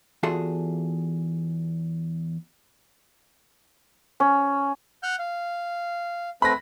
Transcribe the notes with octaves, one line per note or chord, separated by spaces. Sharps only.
E2 F4 F#4 G#4 A4 A5
C#4
F#5 F6 G6
F5
A3 C4 B4 B5 A#6